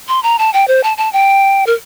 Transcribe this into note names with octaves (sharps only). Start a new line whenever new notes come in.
C6
A#5
A5
G5
C5
A5
A5
G5
A#4